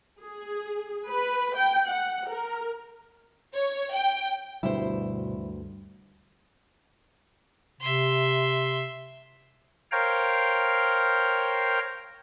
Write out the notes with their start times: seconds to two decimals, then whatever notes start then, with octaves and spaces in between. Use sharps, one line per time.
0.20 G#4
1.08 B4
1.56 G5
1.87 F#5
2.29 A#4
3.56 C#5
3.94 G5
4.63 D2 G2 B2 G3 E4 C5
7.81 C3 E5 C6
9.92 A#4 C5 C#5 F5 G5 A#5